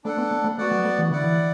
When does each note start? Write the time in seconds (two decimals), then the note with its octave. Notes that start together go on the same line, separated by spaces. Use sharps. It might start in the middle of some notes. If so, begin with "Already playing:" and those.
0.04 A3 D4 A4 F#5
0.18 B3
0.31 A3
0.44 A3
0.58 A3 B3 F#4 D5 F#5
0.71 F#3
0.85 A3
0.98 E3
1.11 D3 E4 D5 F#5
1.24 E3